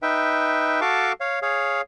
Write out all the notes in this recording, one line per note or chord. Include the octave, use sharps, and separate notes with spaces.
D#4 B4 E5 G5
F#4 A4 F5 A5 C#6 D6
C#5 F5
G#4 C#5 F5